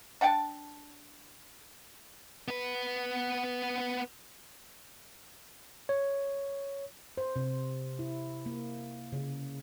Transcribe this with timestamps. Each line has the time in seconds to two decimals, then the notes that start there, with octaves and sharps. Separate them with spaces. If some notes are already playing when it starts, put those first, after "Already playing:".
0.21 D4 F#5 G5 A5
2.48 B3 B4
5.89 C#5
7.17 C5
7.36 C3
7.99 E4
8.46 A#3
9.12 C#3